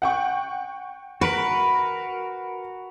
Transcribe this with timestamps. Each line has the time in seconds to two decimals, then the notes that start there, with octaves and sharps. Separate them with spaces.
0.02 F#5 G5 C#6
1.21 F#4 A#4 B4 B5